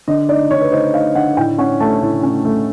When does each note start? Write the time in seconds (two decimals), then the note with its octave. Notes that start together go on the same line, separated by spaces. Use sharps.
0.08 D3 D#5
0.29 D#4 D5
0.51 D3 C#5
0.61 B4
0.72 D#4 C5
0.94 D#4 F5
1.15 D3 F#5
1.37 A2 G5
1.58 C#4 F#5
1.80 A3 A5
2.02 A2
2.23 C#4
2.45 A3